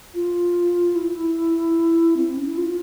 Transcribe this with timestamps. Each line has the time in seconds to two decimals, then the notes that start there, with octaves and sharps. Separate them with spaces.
0.15 F4
0.96 E4
2.17 C4
2.27 C4
2.37 C#4
2.48 E4
2.58 F4